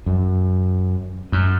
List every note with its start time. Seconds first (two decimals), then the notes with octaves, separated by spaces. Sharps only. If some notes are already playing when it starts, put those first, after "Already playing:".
0.06 F#2
1.32 F#2